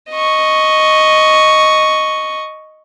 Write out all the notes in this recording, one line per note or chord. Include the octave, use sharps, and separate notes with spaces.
D#5 C#6